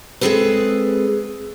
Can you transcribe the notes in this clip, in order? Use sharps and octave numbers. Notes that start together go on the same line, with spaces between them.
G#3 C4 C#4 G#4 A4 B4